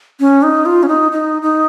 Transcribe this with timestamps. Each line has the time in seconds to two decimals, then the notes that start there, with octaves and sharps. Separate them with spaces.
0.20 C#4
0.43 D#4
0.66 F4
0.83 C#4
0.88 D#4
1.12 D#4
1.42 D#4